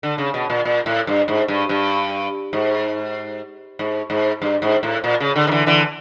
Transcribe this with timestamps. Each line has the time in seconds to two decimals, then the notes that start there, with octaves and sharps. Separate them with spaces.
0.03 D3
0.18 C#3
0.34 B2
0.50 A#2
0.65 A#2
0.86 A2
1.07 G2
1.28 G#2
1.48 G2
1.69 G2
2.53 G#2
3.79 G#2
4.10 G#2
4.42 G2
4.62 G#2
4.83 A2
5.04 A#2
5.20 C#3
5.36 D3
5.47 D#3
5.51 D3 E3
5.67 D3 E3